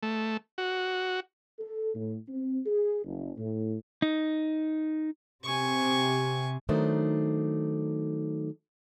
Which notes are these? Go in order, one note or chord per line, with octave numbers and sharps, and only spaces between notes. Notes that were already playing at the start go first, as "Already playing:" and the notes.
A3
F#4
A4
A2
C4
G#4
F#1
A2
D#4
C3 G#5 C#6
D#3 F#3 A3 D4 D#4 C5